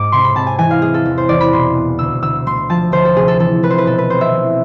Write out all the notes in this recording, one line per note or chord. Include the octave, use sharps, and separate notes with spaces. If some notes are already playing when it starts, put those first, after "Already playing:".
Already playing: G#2 D6
C3 C6
B5
C3 A5
G#5
E3 G#5
F5
G#3 G#4
A4
E2
C5
E2 D5
B5
B2 C6
B3
D2 E6
D2 E6
A3 C6
F3 A5
D2 C5
A4
C3 G#4
A4
E3 A4
A3 B4
C5
B4
B2 A4
B4
C4 C5
E5
E3